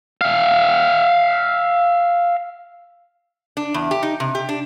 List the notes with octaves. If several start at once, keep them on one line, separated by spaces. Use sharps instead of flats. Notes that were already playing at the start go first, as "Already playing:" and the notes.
E5 F5
D4
E2
G4
D#4
C3
G4
D4